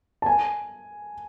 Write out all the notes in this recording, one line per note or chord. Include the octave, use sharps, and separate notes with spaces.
A5
G#5